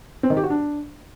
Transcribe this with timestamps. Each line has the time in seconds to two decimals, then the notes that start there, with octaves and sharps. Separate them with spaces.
0.23 C4
0.30 D#3
0.37 G4
0.43 F#4
0.50 D4